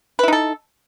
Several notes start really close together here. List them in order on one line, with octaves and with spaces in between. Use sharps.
B4 E4 D#4 A4